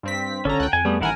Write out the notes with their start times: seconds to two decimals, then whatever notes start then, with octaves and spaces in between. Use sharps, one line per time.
0.03 G2 C4 B6
0.45 G#1 D3 C#4 A4 A#5
0.60 C#2 F#5 G5
0.73 F2 G#5
0.85 G3 A3 B3 G#4
1.01 A1 D#3 E4 A#4 F#5 G#5